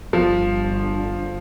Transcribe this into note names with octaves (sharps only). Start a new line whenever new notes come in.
G1 D3 F3